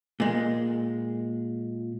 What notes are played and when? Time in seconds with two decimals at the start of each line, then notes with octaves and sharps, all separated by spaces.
0.20 A#2 G#3